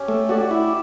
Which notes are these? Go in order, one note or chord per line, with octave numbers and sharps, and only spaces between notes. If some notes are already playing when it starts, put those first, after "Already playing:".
Already playing: C#4 G4
A3
F#4 G4 D5
F#4
E4